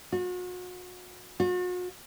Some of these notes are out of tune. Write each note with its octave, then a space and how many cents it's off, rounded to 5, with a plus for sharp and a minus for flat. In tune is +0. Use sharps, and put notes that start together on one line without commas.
F#4 -40
F#4 -45